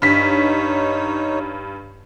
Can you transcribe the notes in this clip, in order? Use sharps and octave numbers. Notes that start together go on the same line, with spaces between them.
G2 D#4 C#5 B6